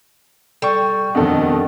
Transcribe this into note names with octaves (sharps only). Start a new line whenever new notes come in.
G3 A4 C#6
F2 B2 D#3 D4 A4